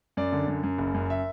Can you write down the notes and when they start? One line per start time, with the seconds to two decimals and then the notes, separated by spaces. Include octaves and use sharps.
0.17 F#2 D5
0.32 D3
0.48 F#2
0.63 F#2
0.78 F#1
0.94 F#2
1.10 E5